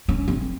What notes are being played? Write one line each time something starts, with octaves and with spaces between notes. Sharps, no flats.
C#4
C4